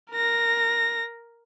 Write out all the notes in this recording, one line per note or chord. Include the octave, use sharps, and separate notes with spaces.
A#4 A#6